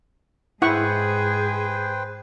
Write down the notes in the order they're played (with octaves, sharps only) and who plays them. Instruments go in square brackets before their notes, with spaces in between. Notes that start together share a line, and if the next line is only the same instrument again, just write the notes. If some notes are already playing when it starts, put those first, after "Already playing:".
[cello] G#2 G#4 [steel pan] E4 F#5 C#6 [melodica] B4 C5 G5